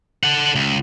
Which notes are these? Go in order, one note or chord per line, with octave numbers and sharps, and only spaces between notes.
A4 F#5
C#2